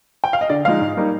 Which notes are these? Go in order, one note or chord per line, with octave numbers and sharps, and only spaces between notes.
G5
F5
D#5
D3 D5
F3 G#3 D#4 F5
G#2
G3 A#3 D#4